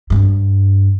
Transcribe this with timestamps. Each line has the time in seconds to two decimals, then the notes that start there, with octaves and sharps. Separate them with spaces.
0.10 G2 C4